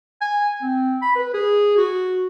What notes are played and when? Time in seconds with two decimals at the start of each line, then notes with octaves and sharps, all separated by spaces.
0.21 G#5
0.62 C4
1.02 B5
1.15 B4
1.34 G#4
1.77 F#4